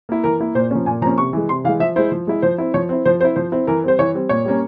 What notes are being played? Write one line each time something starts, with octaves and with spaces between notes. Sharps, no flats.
A#3 E4
E3 A#4
A#3 E4
A#2 C5
F3 A#3 C#4
A#2 G#5
F3 A#3 C#4 A#5
C3 C#6
E3 G#3
C3 C6
E3 G#3 F5
F3 E5
G#3 E4 C5
F3
G#3 E4
F3 C5
C4 E4
F3 C#5
C4 E4
F3 C5
C4 E4 C5
F3 C5
C4 E4
E3 A#4
G3 C4 C5
E3 C#5
G3 C4
A#2 C#5
G3 A#3 C#4